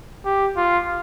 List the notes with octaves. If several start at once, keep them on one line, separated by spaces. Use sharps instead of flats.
G4
F4